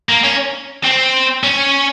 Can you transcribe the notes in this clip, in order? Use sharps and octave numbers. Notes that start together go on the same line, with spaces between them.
A#3
C#4
C4
C#4